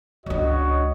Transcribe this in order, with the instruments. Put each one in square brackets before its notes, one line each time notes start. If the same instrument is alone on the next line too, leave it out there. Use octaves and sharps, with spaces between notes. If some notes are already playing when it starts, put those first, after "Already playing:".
[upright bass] C#2 D4 [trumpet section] F#4 C#5 D#5